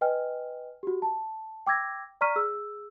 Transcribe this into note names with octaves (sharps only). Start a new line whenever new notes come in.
B4 D#5 G5 G#5 F6
F#4 G4
A5
G5 D6 E6 G#6 A#6
D5 A#5 C#6 F6 B6 D#7
G#4 E6